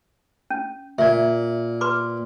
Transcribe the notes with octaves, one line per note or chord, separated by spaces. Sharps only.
C#4
A#2 D5 E5
B4 C6 D6